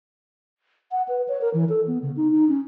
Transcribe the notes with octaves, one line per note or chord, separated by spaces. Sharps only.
F#5
B4
C#5
A#4
E3
A4
B3
C#3
D#4
D#4
C#4